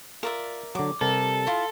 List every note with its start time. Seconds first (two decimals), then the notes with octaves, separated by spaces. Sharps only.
0.23 F4 A#4 D5 E5
0.75 D3 F#3 D6
1.01 C3 G3 A4 A#4
1.47 E4 F4